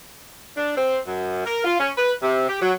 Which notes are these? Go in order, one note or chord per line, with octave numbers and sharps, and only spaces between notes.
D4
C4
F#2
A#4
F4
C#4
B4
C3
G4
F#3